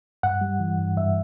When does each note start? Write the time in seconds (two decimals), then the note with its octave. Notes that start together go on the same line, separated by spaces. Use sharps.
0.23 G2 F#5
0.41 G3
0.60 E3
0.79 G2
0.97 G2 E5